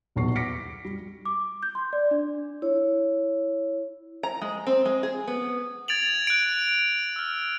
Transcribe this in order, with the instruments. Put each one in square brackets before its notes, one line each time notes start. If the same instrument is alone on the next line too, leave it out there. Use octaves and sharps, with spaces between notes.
[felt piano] D#1 B1 E2 C#6 C7
D6 A#6 B6 C#7 D7
G3
[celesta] D6
G6
C6
D5
D4
[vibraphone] E4 C#5
[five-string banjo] A#5
G#3
C4
G#3
G#4
B3
[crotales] G#6 A6 D7 F7 F#7
F#6 D7
E6 F6